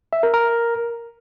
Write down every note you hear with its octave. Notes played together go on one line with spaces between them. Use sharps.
E5
A#4
A#4